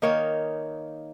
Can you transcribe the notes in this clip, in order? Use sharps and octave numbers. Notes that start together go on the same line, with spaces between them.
D#3 A#3 D#4 C#5